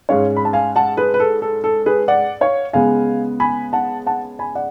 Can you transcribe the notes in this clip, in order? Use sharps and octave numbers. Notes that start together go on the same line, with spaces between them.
G#2 G#3 C#4 C#5 F5
B5
A5
F5 G#5
F#5 A5
G#4 B4
B4
A4
A4
A4
G#4 B4
D5 F#5
C#5 F5
C#3 G#3 B3 F5 G#5
G#5 B5
F#5 A5
F#5 A5
G#5 B5
D5 F#5